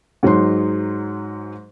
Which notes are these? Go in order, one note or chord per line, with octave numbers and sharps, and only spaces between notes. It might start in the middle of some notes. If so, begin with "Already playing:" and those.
G#2 F#3 D#4 C6